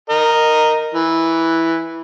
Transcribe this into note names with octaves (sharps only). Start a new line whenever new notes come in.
A#4 D#5
E3